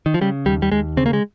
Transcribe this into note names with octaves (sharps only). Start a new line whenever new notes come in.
D#3
F3
C#3 G3
D#2 G3
G3
D#2 G#3
C#3 C4
A#3
G#3